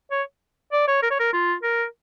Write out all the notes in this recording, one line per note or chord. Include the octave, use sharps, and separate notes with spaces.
C#5
D5
C#5
A#4
C#5
A#4
F4
A#4